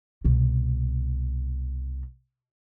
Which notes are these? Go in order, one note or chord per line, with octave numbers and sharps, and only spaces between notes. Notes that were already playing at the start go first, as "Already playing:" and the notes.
C2 B2